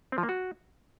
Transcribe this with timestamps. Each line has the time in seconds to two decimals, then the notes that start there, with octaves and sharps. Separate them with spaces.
0.12 C4
0.18 F3
0.23 A#3
0.29 F#4